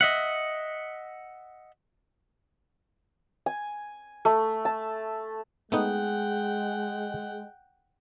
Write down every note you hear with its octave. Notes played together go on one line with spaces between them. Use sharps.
D#5 E5 F#5
G#5
A3
A5
G#3 A3 B3 D#4 F#5 G5